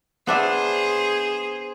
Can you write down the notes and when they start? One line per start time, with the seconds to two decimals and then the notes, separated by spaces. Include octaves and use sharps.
0.27 B3 D4 G#4 C5 E5